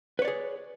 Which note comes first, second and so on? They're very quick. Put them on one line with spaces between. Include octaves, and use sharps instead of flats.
B4 C#5 D5 G#4